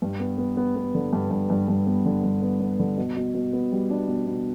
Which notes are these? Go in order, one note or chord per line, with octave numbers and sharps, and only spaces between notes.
G2
B3
B3
B3
B3
D3
G2
G2
G2
G2
B3
D3
G2
B3
B3
D3
B2
B2
B2
B3
G3
D4
B2
B2